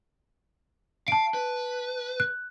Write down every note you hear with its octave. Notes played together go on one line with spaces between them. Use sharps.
F5 A5 D7
B4
F#6